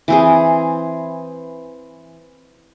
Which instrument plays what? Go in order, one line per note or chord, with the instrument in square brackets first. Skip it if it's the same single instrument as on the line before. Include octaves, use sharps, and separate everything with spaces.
[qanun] E3 C4 G#4